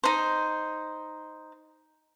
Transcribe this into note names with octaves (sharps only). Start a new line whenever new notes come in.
D#4 C5